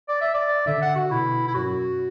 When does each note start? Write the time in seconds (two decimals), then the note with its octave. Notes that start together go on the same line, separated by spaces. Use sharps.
0.08 D5
0.21 E5
0.34 D5
0.66 D3 E5
0.82 F#5
0.95 F#4
1.11 B2 E4
1.47 E4
1.54 F#2 F#4